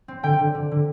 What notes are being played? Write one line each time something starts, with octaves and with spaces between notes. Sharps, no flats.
C4
D3 G5
D3
D3
D3